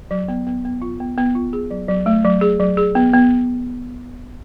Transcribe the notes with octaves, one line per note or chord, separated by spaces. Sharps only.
F#3
B3
B3
B3
F4
B3
B3
F4
G#4
F#3
F#3
A3
F#3
G#4
F#3
G#4
B3
B3